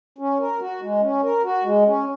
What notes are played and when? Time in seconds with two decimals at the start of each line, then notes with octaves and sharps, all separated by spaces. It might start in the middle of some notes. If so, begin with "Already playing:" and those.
0.18 C#4
0.40 A#4
0.61 F#4
0.81 G#3
1.02 C#4
1.23 A#4
1.44 F#4
1.64 G#3
1.85 C#4